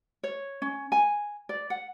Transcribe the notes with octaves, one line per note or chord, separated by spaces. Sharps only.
C#5
C#4
G#5
D5
F#5